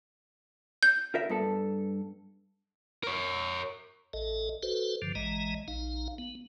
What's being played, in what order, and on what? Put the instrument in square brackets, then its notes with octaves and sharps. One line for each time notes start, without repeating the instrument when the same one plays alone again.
[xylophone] G6
[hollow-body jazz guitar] F4 A#4 E5
G2 B3 A4
[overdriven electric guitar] A#4 C#5
[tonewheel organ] A1 A4 D#5
F#4 A4 B4 C5
G2 D3 F3
A1 E3 G#3 D#5 A#5
A#1 D#4 F5
B3